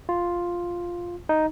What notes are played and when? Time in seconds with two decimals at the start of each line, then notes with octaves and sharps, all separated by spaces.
0.09 F4
1.29 D#4